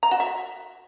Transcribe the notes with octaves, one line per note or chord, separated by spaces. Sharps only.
A#5
F#4
E5